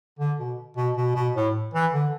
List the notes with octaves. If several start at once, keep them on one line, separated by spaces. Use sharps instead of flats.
D3
B2
B2
B2
B2
A2
E3
D3